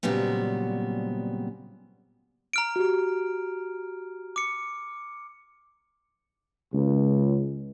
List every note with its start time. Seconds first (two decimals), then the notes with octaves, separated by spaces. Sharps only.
0.03 A#2 C#3 F#3 G3 B3 C4
2.53 A#5 F6 D7
2.76 F#4 G4
4.36 D6 C#7
6.73 C#2